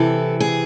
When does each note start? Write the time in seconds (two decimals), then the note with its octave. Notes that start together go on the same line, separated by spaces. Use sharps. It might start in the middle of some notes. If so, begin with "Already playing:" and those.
Already playing: C3 E3 A4
0.40 G#4